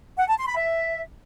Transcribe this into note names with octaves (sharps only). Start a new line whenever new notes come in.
F#5
A5
C6
B5
E5